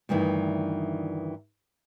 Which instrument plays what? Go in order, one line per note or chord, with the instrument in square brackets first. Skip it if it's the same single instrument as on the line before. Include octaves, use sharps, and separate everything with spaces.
[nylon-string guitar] D2 G2 D#3 E3